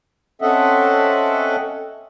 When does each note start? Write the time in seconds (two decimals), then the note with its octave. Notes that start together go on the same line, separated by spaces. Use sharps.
0.42 C4 C#4 A4 D#5 E5 F#5